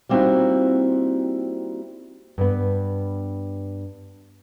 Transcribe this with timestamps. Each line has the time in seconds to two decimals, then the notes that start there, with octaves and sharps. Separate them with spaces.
0.09 G3 A#3 C4 D#4 E4 F#4
2.38 G2 B3